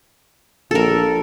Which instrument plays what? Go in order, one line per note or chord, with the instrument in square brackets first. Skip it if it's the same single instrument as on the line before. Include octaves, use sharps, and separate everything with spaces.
[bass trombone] A#1 [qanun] A4 A#4